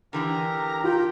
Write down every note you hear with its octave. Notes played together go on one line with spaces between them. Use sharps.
D3 E3 D4 G4 A#4 A#5
F4 G5